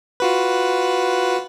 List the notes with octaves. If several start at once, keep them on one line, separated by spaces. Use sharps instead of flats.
F4 F#4 B4